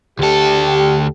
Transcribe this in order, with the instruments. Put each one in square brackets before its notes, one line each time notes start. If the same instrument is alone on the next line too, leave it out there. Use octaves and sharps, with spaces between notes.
[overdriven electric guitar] D2 A4 [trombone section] G4